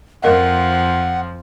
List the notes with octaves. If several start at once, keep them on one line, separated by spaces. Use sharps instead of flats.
F2 F3 A#4 D#5 F5 F#5